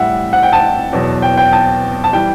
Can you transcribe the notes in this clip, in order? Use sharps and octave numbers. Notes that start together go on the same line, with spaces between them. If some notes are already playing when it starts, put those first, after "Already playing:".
Already playing: A2 G3 E5 F#5
F#5
G5
A5
E2 B2 F#3
G5
G5
A5
A5
E3 G3 G5